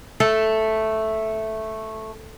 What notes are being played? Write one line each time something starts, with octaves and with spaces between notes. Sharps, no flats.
A3 A4